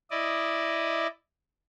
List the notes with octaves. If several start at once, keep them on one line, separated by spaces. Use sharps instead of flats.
E4 D5 D#5